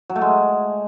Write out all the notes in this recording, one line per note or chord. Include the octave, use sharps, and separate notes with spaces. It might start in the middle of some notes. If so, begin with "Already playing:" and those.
F#3
A3
G#3